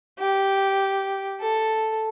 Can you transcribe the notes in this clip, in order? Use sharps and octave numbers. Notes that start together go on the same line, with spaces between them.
G4
A4